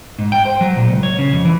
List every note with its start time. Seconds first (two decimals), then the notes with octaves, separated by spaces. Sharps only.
0.19 G#2
0.32 G5
0.45 C5
0.61 F#3
0.76 A#2
0.90 C#2
1.03 C#5
1.19 C#3
1.32 F2
1.45 E3